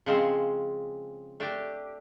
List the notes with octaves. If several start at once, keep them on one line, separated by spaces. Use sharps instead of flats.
C#3 F3 G#3 C4
A3 D4 G4